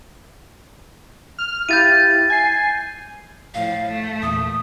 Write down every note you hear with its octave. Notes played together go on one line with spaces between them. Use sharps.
F6
E4 G4 F5 G6 A6 D#7
G#5 C7
A2 F3 F5
A3
E2 A#2 D#6